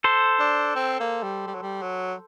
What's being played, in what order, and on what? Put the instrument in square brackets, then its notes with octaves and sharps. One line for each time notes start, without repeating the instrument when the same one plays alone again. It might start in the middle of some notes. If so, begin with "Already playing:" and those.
[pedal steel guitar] A4 C5
[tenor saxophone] D4
C4
A#3
G3
G3
F#3
G3
F#3